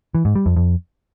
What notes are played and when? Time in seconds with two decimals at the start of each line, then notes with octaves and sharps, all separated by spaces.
0.15 E3
0.25 G#2
0.35 G3
0.46 F2
0.56 F2